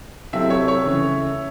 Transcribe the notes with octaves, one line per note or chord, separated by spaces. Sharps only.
C3 F#3 C4 E4 A4 E5
C#5
C#5
C#3 E3 A3 C#4